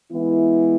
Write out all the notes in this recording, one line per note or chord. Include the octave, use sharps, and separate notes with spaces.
E3 G#3 B3 E4